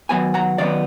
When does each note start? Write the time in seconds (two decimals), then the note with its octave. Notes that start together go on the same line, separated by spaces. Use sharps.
0.09 D#3 F#3 B3 G#5 B5
0.34 F#5 A#5
0.58 D#3 F#3 B3 D5 F5